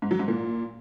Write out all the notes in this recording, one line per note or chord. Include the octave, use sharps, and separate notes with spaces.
G#2
F#3
G#2
A#2